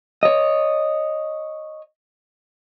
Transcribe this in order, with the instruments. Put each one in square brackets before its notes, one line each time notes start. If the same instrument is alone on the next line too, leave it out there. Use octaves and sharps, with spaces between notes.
[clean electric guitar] C#5 D#5